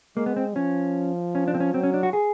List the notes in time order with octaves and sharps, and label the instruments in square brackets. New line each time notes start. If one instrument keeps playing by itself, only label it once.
[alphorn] G#3 [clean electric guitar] A#3
[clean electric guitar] B3
C4
[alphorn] F3 [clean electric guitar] C#4
[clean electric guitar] C#4
D4
C4
C#4
[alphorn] F#3 [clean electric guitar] C4
[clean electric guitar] C#4
D4
F#4
G#4